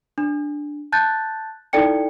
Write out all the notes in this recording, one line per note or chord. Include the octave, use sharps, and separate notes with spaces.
D4
A5 F#6 G6 A6
D#4 E4 A4 D5 G5 C#7